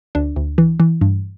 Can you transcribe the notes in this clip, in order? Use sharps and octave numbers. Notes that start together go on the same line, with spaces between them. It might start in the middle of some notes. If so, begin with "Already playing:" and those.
D2 D4
D2
E3
E3
G2